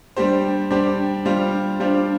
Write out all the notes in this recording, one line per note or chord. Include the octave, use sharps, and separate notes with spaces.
G3 D4 G4 C5
G3 D4 G4 C5
G3 D4 F4 C5
G3 D4 F4 C5